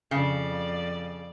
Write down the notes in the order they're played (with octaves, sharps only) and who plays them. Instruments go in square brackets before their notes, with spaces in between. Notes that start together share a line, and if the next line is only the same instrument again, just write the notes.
[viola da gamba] F2 D5 [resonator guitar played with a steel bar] C#3